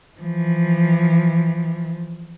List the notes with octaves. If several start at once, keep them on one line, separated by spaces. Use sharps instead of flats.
E3 F3